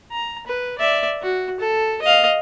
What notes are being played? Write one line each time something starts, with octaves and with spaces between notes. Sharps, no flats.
A#5
B4
D5 E5
F#4
A4
D#5 F5